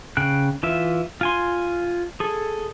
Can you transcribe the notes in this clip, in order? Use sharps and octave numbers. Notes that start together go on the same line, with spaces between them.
C#3 G5 F#6
E3 F4 E5
F4 G#5 C6
G#4 A4